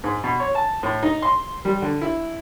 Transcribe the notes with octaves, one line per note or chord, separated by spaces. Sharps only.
G#2
B2
C#5
A5
A2
D#4
C6
G3
D3
E4